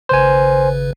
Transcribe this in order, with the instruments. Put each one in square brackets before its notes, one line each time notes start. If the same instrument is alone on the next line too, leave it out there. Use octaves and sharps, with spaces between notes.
[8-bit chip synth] G#1 C#3 B4 [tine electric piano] C5 G#5